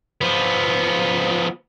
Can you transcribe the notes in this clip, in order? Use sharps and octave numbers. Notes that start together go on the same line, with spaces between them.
F3 B3